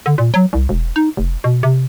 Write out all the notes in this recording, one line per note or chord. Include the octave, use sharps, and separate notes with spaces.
D3
A#2
F#3
C2
E1
D#4
F1
B2
C3